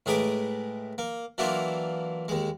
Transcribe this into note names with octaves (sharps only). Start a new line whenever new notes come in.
A2 G#3 G#4 A#4 B4 D6
A#3
E3 F#3 A#3 D4 E4 F4
D#2 G#3